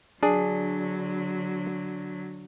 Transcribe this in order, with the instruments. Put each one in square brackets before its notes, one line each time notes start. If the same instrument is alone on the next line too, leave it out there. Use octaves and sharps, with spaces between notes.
[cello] D3 F#3 [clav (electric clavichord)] D4 G#4